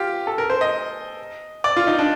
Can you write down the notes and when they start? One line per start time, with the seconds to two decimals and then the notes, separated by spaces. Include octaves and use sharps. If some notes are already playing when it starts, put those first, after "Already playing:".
Already playing: F4 G4
0.27 A4
0.38 A#4
0.50 C5
0.61 D#5
1.64 D5
1.77 F4
1.87 D#4
1.98 D4